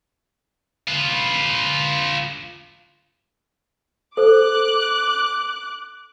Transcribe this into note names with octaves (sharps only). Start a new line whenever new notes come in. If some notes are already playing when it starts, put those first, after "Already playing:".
F4 B4
A4 C5 D6 F#6